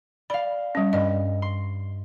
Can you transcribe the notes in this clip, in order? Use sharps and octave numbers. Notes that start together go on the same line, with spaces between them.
D5 F5 B5
G3 C#4
G2 D5 D#5
C6